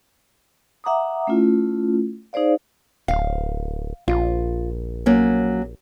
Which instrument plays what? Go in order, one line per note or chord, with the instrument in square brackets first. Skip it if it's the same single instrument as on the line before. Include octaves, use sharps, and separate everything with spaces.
[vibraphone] E5 F#5 A#5 D6 D#6
A3 C#4 E4 F4
D#4 G#4 C5 D5 F5
[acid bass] D1 [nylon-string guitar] F5
[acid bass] A#1 [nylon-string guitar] F4
[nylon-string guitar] F#3 A#3 C#4